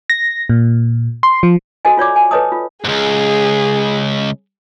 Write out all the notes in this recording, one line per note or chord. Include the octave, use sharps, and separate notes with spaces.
A#6
A#2
C6
F3
F#4 A4 C5 D#5 G#5
F4 C#5 D5 D6
G#5
A4 B4 C#5 D#5 A5 D#6
F4
C#2 G#2 G#4